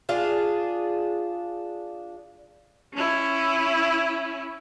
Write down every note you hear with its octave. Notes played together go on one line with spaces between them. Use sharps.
D4 F4 G#4
C#4 E4